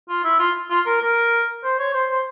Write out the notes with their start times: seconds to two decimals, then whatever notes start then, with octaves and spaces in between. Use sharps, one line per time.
0.09 F4
0.24 E4
0.39 F4
0.70 F4
0.86 A#4
1.02 A#4
1.64 C5
1.79 C#5
1.94 C5
2.10 C5